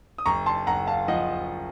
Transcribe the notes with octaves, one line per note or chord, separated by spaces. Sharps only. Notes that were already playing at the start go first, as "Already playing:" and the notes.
D#6
F#1 A#5 C#6
A5 C6
F#1 F#5 A#5
F5 A5
F3 D#5 F#5